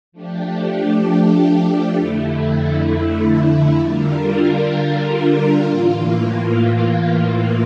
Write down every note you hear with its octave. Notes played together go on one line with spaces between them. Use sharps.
F3 A3 D4 G4
F2 D3 A3 E4
D3 G3 D4 F4 A#4
A2 E3 A#3 F4